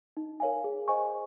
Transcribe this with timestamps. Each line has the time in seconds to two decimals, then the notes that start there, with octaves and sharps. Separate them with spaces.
0.17 D#4
0.40 A#4 C#5 F5 G#5
0.64 G#4
0.88 C5 D#5 G#5 C#6